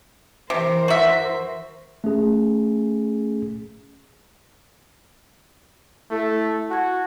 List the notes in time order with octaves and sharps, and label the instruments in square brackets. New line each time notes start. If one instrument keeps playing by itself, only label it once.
[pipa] C3 [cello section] E3 A#4 C5
[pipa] F#4 E5
[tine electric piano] A3 C#4 G#4
[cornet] A3 [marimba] E4 A4
[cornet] F#4 [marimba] A5 C#6 G#6